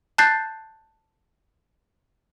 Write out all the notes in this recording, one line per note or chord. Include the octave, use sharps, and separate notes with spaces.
A5 F#6 G6 A6 C7